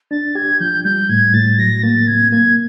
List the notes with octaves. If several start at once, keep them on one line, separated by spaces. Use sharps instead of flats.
D4 A6
G4 G#6
F3 G6
G3 G6
A2 G#6
A2 A6
F#3 A#6
A#3 A6
C3 G#6
A#3 G#6